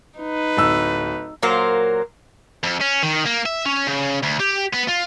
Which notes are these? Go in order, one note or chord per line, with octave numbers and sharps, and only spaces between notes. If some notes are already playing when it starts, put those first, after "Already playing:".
D#4 B4
D1 E6
A#2 F#3 A#3 A#4 C5
F2
C#4
D#3
A#3
E5
C#4
C#3
D2
G4
B3
F4